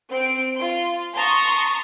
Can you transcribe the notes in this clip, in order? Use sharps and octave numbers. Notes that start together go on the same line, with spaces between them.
C4 D7
F4 C6
A5 A#5 C6 C#6 D#6